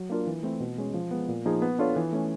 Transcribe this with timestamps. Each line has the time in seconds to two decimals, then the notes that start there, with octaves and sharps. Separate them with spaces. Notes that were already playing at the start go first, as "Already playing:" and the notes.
Already playing: F#3
0.09 A#3 D4 F4 A#4
0.27 E3
0.43 A3 C4 E4
0.60 B2
0.78 G#3 C#4
0.94 F3
1.11 G#3 B3
1.28 A#2
1.45 F3 A#3 D#4 G#4
1.62 B3
1.79 D4 F4 A4 C#5
1.96 E3
2.13 A3 C#4